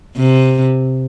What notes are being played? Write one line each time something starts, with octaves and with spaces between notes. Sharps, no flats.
C3